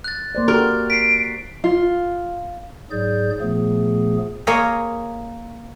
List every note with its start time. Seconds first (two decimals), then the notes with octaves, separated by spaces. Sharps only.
0.04 F#6 A6
0.35 A#3 C5 D5
0.48 F#4 G4 A#4 C#6
0.90 B6 C7 D7
1.64 F4
2.91 G#2 F#3 G#4 D5 G6
3.40 A#2 F3 A3 B3 G#4
4.47 A#3 G#4 A#4 C#5 D#5 F5